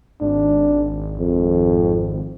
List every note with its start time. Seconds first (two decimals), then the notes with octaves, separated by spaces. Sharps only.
0.21 G#1 D4
1.18 F2